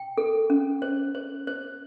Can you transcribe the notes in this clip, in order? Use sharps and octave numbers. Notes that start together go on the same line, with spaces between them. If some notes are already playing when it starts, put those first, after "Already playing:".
Already playing: G5
A4
C#4
C5
C5
C5